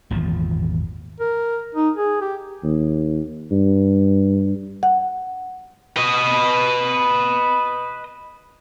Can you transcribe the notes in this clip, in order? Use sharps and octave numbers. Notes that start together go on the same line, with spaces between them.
G#1 E2 A#2 F3
A#4
D#4
G#4
G4
D#2
G2
F#5
B4 D#5